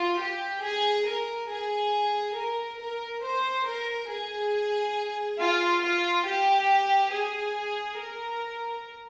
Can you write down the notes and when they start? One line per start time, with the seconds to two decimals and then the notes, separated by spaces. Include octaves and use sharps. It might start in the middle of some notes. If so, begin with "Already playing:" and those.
Already playing: F4
0.21 G4
0.64 G#4
1.08 A#4
1.51 G#4
2.38 A#4
2.81 A#4
3.24 C5
3.68 A#4
4.11 G#4
5.41 F4
5.85 F4
6.28 G4
7.14 G#4
8.00 A#4